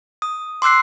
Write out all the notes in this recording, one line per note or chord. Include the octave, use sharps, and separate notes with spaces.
D#6
C6 D6 E6 F#6 C7